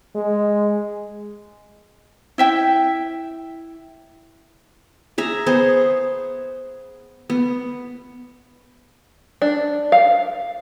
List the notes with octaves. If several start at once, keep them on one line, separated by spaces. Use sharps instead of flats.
G#3
E4 E5 G5
G#4 E5 A#5
B3 G#4 C5
B3
D4
F5